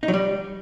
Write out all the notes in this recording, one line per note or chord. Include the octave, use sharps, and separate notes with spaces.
D#4
F#3
G3